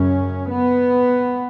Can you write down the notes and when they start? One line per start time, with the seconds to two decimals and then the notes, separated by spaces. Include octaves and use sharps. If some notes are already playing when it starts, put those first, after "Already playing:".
Already playing: F#2 C#3 C#4
0.50 B3